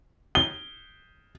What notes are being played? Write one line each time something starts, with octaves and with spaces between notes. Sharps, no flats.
G7